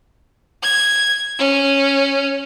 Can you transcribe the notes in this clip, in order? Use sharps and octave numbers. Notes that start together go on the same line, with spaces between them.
G#6
C#4